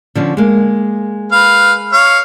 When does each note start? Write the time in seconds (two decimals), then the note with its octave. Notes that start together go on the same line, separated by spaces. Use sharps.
0.15 D3 F3 C#4
0.37 G#3 A#3
1.32 B4 F5
1.93 C#5 F5